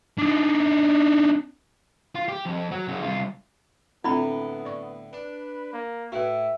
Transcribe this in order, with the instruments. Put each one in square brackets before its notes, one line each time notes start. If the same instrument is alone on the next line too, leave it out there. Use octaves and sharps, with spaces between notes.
[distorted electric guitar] D4 D#4
F4
G4
F2
F#3
F#2 C#3
C2 F4
[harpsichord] A2 D3 [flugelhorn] B3 [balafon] C4 F4 [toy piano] E4 F#5 B5
[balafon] D5 C#6
[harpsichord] D4 [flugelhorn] B4
[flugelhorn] A#3
[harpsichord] A2 E4 [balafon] F#4 B4 [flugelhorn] E5